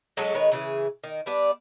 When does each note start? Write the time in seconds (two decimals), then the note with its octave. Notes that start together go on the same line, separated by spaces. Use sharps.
0.17 F#3 G#3 C#4 A4
0.35 D#3 G#3 B4 C#5
0.52 C#3 E3 G#4
1.04 D#3
1.26 G3 B3 D4